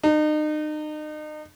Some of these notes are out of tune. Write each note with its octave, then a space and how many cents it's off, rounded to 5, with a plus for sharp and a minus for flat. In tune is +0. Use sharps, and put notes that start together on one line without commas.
D#4 -35